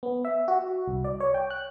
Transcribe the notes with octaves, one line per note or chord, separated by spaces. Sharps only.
B3
E5
F#4
C2
D5
C#5
G5
F#6